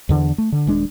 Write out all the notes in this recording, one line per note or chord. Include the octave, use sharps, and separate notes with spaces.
E2 D3
A3
D3
D#1 G#3 D4